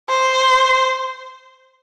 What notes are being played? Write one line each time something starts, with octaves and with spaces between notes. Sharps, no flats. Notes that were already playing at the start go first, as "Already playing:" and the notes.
C5